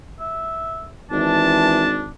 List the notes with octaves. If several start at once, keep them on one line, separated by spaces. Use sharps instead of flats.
E5
G#1 E3 D4 A5